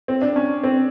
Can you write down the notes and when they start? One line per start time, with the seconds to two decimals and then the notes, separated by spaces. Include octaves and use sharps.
0.08 C4
0.22 D4
0.36 C#4
0.64 C4